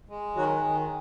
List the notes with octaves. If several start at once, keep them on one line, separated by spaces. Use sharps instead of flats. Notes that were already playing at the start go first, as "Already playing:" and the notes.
G#3
D#3 F#3 F#4
D#3